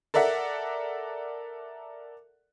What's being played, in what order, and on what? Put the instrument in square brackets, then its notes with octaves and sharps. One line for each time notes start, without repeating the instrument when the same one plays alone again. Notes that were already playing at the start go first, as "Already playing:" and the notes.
[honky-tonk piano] A4 A#4 D5 E5 F#5